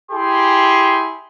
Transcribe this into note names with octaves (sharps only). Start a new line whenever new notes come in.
E4 G4 G#4 C6